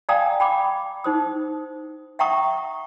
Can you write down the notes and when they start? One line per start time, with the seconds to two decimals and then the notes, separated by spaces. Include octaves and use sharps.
0.09 D5 F5 G5 G#5 A#5 D#6
0.40 G5 B5 D6
1.04 D#4 C5 D#6
2.19 E5 F#5 G5 A#5 C#6 D#6